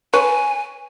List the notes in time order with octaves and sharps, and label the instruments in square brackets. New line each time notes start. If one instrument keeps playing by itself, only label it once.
[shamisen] B4 C#5 [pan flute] G#5